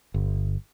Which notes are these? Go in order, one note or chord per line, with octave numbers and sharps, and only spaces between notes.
G1